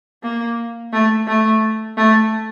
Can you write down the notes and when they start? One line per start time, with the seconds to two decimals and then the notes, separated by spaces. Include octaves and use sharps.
0.23 A#3
0.93 A3
1.27 A3
1.97 A3